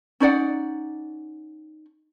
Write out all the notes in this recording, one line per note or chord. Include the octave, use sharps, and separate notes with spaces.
C#4 D#4 D5 F#5